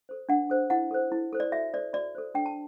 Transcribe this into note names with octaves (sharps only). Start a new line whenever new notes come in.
A4 C5
D4 F#5
A4 C5
E4 F#5
A4 C5
E4
A4 C5
D5
F#4 E5
A4 C5 D5
F#4 D5
A4 C5
D4 G5
A5